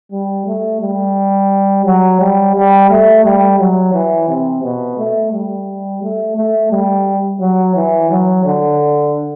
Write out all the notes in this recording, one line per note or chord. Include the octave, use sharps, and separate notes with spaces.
G3
A3
G3
F#3
G3
G3
A3
G3
F#3
E3
C3
B2
A3
G3
A3
A3
G3
F#3
E3
F#3
D3